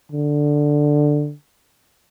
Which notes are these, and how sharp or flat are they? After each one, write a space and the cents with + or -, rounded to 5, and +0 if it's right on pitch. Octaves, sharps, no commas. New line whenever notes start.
D3 +5